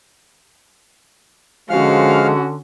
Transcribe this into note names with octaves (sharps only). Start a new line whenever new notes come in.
D3 F3 G#3 C#4 F#4 F5 F6